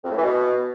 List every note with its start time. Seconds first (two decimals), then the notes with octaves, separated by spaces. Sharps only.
0.04 F2
0.11 A2
0.17 E3
0.23 B2